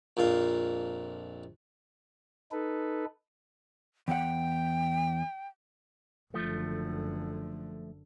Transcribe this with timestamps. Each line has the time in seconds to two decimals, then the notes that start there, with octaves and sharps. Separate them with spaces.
0.17 A#1 F2 A#2 F5
2.52 D#4 A4 B4
4.08 E2 F#5 G5
6.34 F#1 D3 F3 A3